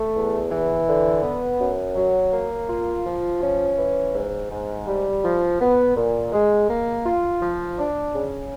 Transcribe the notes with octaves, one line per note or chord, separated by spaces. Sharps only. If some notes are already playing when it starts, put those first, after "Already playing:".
Already playing: A3
E2
E3
D3
B3
F#2
F#3
A#3
F4
F3
C#4
E3
G#2
G#2
G3
F3
B3
A#2
G#3
A#3
F4
F3
D4
C#3